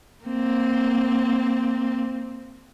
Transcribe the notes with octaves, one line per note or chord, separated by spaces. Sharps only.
A#3 C4